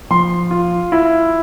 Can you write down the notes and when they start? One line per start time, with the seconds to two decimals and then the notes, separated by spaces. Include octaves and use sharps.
0.11 F3 C6
0.51 F4
0.92 E4